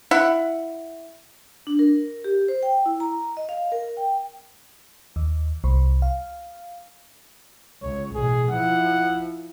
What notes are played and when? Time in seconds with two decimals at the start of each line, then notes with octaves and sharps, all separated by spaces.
0.11 E4 F#5
1.67 D4
1.79 A#4
2.24 G4
2.48 C5
2.63 G5
2.86 E4
3.00 A#5
3.37 D#5
3.49 F5
3.72 A#4
3.97 G5
5.16 D#2
5.64 C2
6.02 F5
7.82 C#2 C#5
8.15 A1 B2 G#4
8.51 F3 E4 F#5